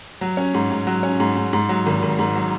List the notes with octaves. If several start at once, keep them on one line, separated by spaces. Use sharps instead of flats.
F#3
C#4
G#2
G#2
F#3
C#4
G#2
G#2
G#2
F#3
G#1
G#1
G#2
F#3